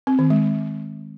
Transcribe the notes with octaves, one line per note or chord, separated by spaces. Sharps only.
C4
D#3
G#3